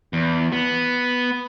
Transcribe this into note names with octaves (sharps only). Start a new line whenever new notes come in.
E2
B3